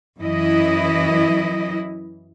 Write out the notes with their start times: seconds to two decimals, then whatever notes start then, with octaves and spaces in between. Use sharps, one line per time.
0.19 F#2 E3 E4 D#5